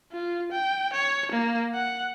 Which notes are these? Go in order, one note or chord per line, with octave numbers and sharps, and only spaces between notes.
F4
G5
C#5
A#3
F#5